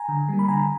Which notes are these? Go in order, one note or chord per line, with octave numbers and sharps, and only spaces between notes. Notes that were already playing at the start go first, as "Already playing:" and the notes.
Already playing: G#5 A#5
D3
G3 A#3
B5
D3 G#5 A#5